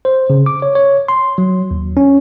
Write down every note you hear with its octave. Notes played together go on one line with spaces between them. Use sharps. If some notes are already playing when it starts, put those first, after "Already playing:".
C5
C#3
D6
C#5
C#5
C6
F#3
D#2
C#4